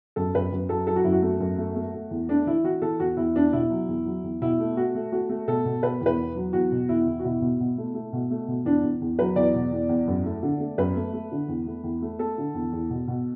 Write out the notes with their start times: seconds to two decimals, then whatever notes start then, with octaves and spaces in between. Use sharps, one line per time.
0.16 F#2 A4
0.35 F#2 B4
0.52 F#2
0.69 F#3 A4
0.87 F#3 A4
0.96 F#4
1.04 F#2 E4
1.12 F#4
1.22 A3
1.40 F#2
1.58 A3
1.76 A3
1.94 A3
2.11 E2
2.29 A3 D4
2.46 E3 E4
2.64 E3 F#4
2.82 E3 A4
3.00 E2 F#4
3.17 E2 E4
3.35 E2 D4
3.53 B2 E4
3.70 F#3
3.89 E2
4.06 F#3
4.24 E2
4.41 B2 E4
4.60 A3
4.77 A3 F#4
4.95 A3
5.12 A3 F#4
5.29 A3
5.48 B2 A4
5.65 B2
5.82 B2 B4
6.01 E2 B4
6.18 E2
6.36 F#3
6.53 E2 F#4
6.72 B2
6.89 E2 E4
7.07 E2
7.19 F#4
7.24 B2 E4
7.41 B2
7.60 B2
7.78 A3
7.95 A3
8.13 B2
8.31 A3
8.48 B2
8.65 E2 D4
8.83 E2
9.02 E2
9.19 F#3 B4
9.36 E2 D5
9.55 B2
9.71 E2
9.89 E2
10.08 F#2
10.25 A3
10.43 D3
10.60 A3
10.78 F#2 B4
10.96 A3
11.13 A3
11.32 D3
11.48 E2
11.67 A3
11.84 E2
12.02 A3
12.19 A3 A4
12.38 D3
12.54 E2
12.73 E2
12.90 B2
13.08 B2